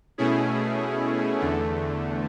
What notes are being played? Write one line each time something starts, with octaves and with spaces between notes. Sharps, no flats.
B2 A3 C#4 E4 G#4
E2 D3 A3